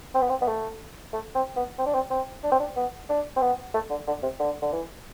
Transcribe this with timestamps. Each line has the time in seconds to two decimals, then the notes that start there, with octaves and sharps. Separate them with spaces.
0.14 C4
0.22 B3
0.29 C4
0.41 B3
0.47 A3
1.13 A3
1.35 C4
1.56 B3
1.78 C4
1.86 D4
1.94 C4
2.10 C4
2.43 D4
2.52 C4
2.59 D4
2.76 B3
3.09 D4
3.36 C4
3.42 B3
3.74 A3
3.90 D3
4.07 D3
4.23 C3
4.40 D3
4.62 D3
4.72 E3